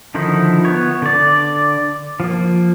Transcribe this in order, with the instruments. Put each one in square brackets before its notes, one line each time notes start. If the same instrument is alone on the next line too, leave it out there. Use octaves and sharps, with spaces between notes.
[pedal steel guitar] D3 D#3 F3 D#4 E4
B3 C#5
D3 D5
F3 A#3